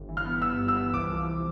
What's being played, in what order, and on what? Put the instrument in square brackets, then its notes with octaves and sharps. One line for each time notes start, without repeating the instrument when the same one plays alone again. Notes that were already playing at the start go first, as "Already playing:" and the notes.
Already playing: [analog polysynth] G1
E3
[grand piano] F6
[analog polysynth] B3
[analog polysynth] G2 [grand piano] E6
[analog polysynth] G1
[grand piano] E6
[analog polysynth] E3
[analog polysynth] C2 [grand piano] D6
[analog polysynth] F3